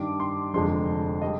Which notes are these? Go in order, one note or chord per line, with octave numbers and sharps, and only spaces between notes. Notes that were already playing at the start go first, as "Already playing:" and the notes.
Already playing: G2 D#3 G3 D4 D6
C6
F1 F2 D3 G#3 D4 C6
G3 D#5